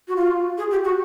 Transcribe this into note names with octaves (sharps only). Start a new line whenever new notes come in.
F#4
F4
G#4
G4
F#4